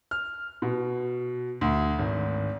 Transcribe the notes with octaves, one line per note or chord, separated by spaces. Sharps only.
F6
B2
D2
G#1